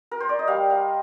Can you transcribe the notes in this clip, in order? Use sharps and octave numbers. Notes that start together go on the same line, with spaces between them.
A#4
C5
D5
D#5
G3 F5
F5